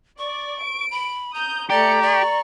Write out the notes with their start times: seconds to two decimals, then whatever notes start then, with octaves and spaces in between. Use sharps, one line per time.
0.18 D5 C#6
0.60 D7
0.91 B5
1.34 A#5 D#6 G6
1.70 A3 G4 D5 A#5 C#7
2.02 D5 C#6